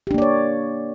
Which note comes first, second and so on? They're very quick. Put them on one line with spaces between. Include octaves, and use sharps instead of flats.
G4 D4 A#3 D5 C#5